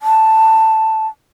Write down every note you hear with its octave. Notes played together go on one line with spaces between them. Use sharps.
A5